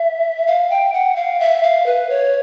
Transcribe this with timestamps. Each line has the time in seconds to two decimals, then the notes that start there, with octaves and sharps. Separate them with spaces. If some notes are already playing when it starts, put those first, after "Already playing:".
Already playing: E5
0.47 F5
0.70 G5
0.93 F#5
1.16 F5
1.40 E5
1.63 F5
1.86 B4
2.10 C#5